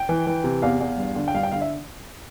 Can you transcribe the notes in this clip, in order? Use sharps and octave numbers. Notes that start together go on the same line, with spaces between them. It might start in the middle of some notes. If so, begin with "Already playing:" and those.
Already playing: G5
E3
E3
C3
E2 F5
E2
G2
D3
G5
G2 F5
G5
D3 F5
E5